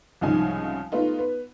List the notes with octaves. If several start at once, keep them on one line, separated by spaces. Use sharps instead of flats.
C2 G#2 C#3 F3 D#4 G#5
A3 B3 D#4 F4
B3